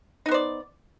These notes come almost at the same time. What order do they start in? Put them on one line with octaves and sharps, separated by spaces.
D#4 B3 C5 D5